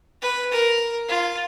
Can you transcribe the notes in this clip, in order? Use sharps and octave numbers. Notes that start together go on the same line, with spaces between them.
B4
A#4
F4